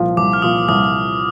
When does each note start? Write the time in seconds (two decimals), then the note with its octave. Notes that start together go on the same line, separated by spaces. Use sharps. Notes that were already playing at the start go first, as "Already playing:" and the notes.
Already playing: C2 A#2 F3
0.17 C2 D6
0.33 F6
0.42 A#2 F3 D#6
0.68 C2 D#6